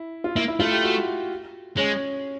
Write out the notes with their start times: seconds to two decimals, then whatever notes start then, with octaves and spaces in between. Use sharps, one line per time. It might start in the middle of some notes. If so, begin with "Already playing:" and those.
Already playing: E4
0.24 F4
0.36 A#3 E4
0.48 E4
0.59 A3 F4
0.71 G4
0.83 F#4
1.77 G#3 C#4